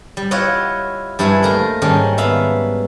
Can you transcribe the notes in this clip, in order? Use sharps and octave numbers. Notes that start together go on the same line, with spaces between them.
G3
E4 F4 G4 C#5 D#5 F#5
G2 G3 E4 C5 E5 G#5
A3 A#3 A#4 C5 D#5
G#2 D#3 G3 C#4 D4
B3 E5 F5 B5